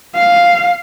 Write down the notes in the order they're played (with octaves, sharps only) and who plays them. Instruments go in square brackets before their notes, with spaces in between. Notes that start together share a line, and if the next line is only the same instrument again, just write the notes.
[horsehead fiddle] F5